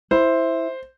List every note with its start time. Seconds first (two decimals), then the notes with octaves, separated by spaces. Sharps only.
0.11 E4 C5